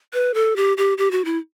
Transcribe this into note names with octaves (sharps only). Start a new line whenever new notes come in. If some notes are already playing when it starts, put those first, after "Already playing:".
B4
A4
G4
G4
G4
F#4
E4